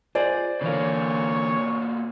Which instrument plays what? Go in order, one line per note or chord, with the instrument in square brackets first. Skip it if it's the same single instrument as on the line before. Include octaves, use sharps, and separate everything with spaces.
[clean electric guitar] F4 G#4 F#5 [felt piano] C5 D5 G#5
[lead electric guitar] B2 A#3 [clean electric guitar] D3 E3 F5 [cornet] C#5